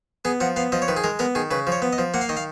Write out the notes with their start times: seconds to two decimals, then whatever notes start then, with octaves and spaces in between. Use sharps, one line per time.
0.25 B3 G#4
0.40 F3 F#5
0.56 B3 F5
0.72 F3 D#5
0.82 C#5
0.88 D#3 B4
0.97 G#4
1.04 G#3 A#4
1.19 B3 A#4
1.35 D#3 G#4
1.51 C#3 B4
1.67 F3
1.72 C#5
1.82 B3
1.93 D#5
1.98 F3
2.14 A#3 F#5
2.21 F5
2.29 D#3 D#5
2.37 F5